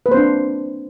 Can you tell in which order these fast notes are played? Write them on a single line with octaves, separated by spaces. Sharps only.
B4 A#3 C5 C4 D4